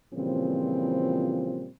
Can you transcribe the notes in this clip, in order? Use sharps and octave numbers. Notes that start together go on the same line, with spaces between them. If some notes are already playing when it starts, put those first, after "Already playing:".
A#2 C#3 E3 F3 G3 C4